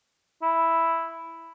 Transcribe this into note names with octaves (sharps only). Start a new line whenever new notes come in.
E4